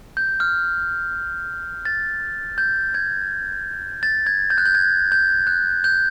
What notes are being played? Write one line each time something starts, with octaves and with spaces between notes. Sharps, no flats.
G6
F6
A6
G6
G#6
A6
G#6
G6
F#6
G6
G#6
G6
F#6
G6